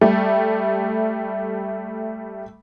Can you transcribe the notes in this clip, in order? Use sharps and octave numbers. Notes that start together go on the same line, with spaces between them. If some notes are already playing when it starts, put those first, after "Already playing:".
G3 A3